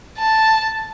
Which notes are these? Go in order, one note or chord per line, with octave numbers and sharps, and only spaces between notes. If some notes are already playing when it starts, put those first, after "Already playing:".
A5